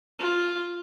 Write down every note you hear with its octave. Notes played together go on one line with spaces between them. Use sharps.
F4